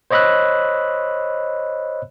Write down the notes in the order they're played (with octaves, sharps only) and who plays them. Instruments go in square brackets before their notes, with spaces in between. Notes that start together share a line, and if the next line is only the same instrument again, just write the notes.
[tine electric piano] C5 C#5 D#5 B5 E6 F#6